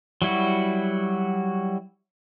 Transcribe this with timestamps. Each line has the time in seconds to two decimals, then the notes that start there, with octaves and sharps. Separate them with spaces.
0.22 F#3 G3 E4 F#4